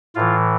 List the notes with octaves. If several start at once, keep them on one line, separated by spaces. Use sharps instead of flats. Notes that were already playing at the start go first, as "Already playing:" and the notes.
A2 E3 F4